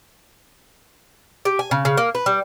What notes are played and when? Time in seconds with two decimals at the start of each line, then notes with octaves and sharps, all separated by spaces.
1.45 G4
1.59 G#5
1.71 C#3
1.85 C#3
1.97 A#3
2.15 B4
2.26 G3